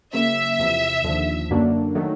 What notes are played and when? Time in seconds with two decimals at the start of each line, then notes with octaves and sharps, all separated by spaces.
0.13 C#3 F#3 A#3 E5
0.59 E2 C3 F3
1.04 D#2 D3 F3
1.50 F#2 D3 F#3 A#3 D4
1.95 D#3 F#3 A3